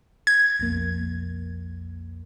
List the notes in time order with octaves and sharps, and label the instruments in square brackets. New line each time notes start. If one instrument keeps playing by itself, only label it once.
[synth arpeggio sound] G#6
[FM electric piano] B1 F2 A#3